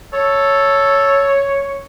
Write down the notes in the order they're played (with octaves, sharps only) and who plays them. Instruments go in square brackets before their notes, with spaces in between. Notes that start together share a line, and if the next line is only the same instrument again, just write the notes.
[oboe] A4 [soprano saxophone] C#5